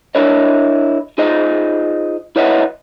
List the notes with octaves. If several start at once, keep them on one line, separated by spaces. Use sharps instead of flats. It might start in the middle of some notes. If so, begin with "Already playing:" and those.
D4 E4 A#4 C#5 D#5
D#4 F4 G#4 C5 D#5
E4 B4 C#5 D#5 E5 F#5